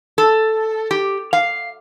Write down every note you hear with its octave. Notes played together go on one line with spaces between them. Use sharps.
A4
G4
F5